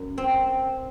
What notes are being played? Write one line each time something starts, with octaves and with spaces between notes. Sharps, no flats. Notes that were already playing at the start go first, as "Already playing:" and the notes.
Already playing: F#2
C4